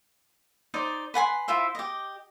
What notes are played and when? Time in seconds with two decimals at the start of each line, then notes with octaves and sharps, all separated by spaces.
0.74 D#4 C5 D5
1.14 B4 F#5 G#5 C6
1.48 E4 F4 C5 E5
1.75 G4 D#5